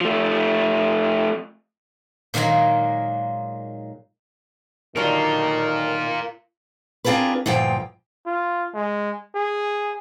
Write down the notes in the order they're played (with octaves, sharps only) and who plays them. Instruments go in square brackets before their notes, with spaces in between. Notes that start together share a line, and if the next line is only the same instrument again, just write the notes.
[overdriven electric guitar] F3 A3
[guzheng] A#2 D#3 F#3 G#3 A#3
[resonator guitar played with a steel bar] D3 F#3 G3 [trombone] D#3 [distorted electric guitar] F4 A#4
[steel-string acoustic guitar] C4 D4 F4 G#4 A#4 B4
D2 G2 A#2 F3 G5
[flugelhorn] F4
G#3
G#4